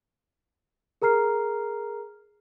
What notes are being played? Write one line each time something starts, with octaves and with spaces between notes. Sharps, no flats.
G#4 A#4 A#5 F6 C7